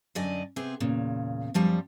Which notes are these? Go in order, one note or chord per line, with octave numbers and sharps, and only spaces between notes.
F#2 D3 D5 D#5 G#5
C3 B3 C4 G#4
E2 A#2 C#3
F#2 F3 G3 G5